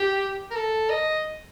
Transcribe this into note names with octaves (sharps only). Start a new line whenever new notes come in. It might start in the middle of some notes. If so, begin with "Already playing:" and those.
Already playing: G4
A#4
A4
D#5